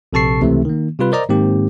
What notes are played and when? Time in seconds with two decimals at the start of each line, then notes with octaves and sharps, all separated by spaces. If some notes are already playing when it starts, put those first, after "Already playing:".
0.13 A#1 C3 A4 A5 C#6 C7
0.41 C#2 C3 E3 A3
0.65 D#3 A#3
0.99 C3 G3 F4 B4
1.12 A#4 C5 D5 D#5 A#5
1.29 G#2 D#3 A#3 C4 G4